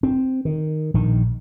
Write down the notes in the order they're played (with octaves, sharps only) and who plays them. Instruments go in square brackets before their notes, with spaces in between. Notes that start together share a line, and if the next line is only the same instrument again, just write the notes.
[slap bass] C4
D#3
A#1 D#3